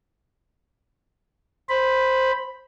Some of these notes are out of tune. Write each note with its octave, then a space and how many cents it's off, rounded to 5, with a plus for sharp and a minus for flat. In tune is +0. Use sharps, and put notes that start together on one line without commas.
C5 +0 B5 +0